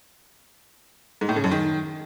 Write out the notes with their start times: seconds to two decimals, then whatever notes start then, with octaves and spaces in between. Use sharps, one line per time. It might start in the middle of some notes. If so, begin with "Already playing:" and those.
1.21 G#2
1.29 A2
1.36 C#3
1.44 F#2
1.51 D#3